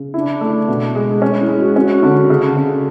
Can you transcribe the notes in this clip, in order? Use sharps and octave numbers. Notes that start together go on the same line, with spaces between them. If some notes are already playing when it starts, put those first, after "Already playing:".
Already playing: C#3
D4 E4
A3
B2
G#3
C#4
E4
G#3
F#4
C#4 F#4
D3
C#3
C#3